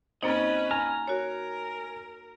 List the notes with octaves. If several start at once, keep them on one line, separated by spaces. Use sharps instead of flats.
F#2 A#3 C4 C#4 D#4 B4 D#5
G#5 A#5 F6
F#4 A#4 C#5